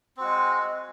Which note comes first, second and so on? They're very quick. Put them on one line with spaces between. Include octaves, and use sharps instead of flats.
C4 F#4 G#3